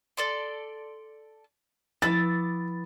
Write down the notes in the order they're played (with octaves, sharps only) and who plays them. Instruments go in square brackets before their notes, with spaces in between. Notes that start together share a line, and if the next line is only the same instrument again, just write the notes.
[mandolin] A4 D5 C6
[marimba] F3 E4 [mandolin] B3 D6 E6 [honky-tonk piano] A6